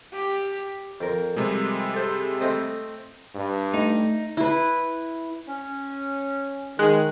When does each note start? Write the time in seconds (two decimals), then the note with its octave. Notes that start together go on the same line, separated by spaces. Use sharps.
0.13 G4
1.01 F2 A#4
1.36 C3 G3 G#3
1.94 A4 C5
2.41 A3 C4 D#5
3.35 G2
3.74 A3 D#4
4.37 E4 B4
5.48 C#4
6.79 D#3 G#3 F#6